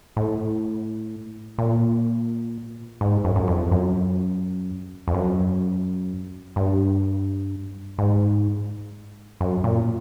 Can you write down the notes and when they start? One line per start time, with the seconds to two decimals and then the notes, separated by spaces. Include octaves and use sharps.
0.16 A2
1.58 A#2
3.01 G#2
3.24 F#2
3.36 F#2
3.48 F2
3.71 F#2
5.08 F2
5.14 F#2
6.56 G2
7.98 G#2
9.41 F#2
9.64 A#2